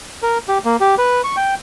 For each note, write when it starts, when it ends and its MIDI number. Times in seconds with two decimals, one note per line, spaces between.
0.22 0.38 70
0.48 0.58 67
0.65 0.77 58
0.80 0.95 67
0.98 1.22 71
1.24 1.36 85
1.37 1.55 79